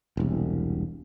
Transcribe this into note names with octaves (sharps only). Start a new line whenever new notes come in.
E1 C2